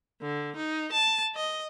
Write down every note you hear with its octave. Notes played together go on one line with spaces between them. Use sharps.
D3
D#4
A5
D#5